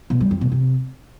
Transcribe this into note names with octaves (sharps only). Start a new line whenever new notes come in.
B2
G3
F2
B2
C3